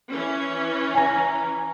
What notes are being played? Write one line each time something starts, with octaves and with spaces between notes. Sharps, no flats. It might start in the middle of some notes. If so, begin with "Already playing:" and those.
E3 C#4
G#5 A#5